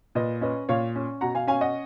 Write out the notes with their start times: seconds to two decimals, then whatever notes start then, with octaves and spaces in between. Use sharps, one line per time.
0.15 A#2 B4 D#5
0.41 C#4 B4 D#5
0.69 A#2 C#5 F5
0.96 C#4
1.21 B2 F#5 A#5
1.35 F5 G#5
1.47 C#4 F5 G#5
1.61 D#5 F#5